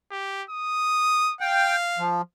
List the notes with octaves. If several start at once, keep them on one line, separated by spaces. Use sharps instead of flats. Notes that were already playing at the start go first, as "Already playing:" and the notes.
G4
D#6
F5 G5
F3